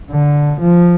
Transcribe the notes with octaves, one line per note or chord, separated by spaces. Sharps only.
D3
F3